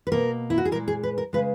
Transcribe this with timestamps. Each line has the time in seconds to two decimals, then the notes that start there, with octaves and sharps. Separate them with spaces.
0.07 B4
0.12 B2 A#3 A#4
0.50 E4
0.58 F#4
0.65 G#4
0.72 A#2 A#4
0.75 G#3
0.88 G#4
1.03 B4
1.18 A#4
1.33 C#3 G#3 B4